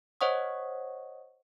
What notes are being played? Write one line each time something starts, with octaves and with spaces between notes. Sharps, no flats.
C5 C#5 D#5 F#5 C#6 D#6